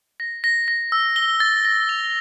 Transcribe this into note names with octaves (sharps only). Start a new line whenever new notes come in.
A#6
A#6
A#6
E6
G7
A6
A#6
F7